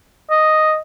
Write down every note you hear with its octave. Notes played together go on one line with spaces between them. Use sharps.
D#5